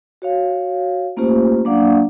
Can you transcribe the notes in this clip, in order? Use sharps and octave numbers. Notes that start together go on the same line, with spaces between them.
F#4 C#5 F5
A3 A#3 C#4 F4 G4 C5
F#3 A#3 D4 D5 F5 F#5